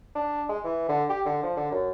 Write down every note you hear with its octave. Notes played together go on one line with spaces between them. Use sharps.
D4
G#3
E3
D3
G4
D3
F3
D3
F#2